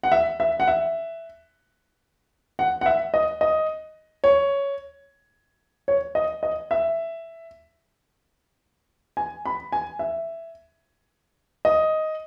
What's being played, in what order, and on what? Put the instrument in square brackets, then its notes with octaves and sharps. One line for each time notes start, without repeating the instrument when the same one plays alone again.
[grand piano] F#5
E5
E5
F#5
E5
F#5
F#5
E5
D#5
D#5
C#5
C#5
D#5
D#5
E5
G#5
B5
G#5
E5
D#5